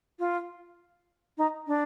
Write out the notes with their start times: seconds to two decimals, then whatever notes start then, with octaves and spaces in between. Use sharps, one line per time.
0.19 F4
1.38 D#4
1.67 D4